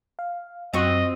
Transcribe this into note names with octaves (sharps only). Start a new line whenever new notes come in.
F5
F#2 C4 F4 F#4 D#5